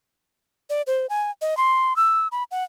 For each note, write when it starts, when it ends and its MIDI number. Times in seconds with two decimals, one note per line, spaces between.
0.70 0.82 74
0.87 1.06 72
1.10 1.31 80
1.42 1.57 75
1.57 1.96 84
1.96 2.28 88
2.32 2.43 83
2.51 2.64 78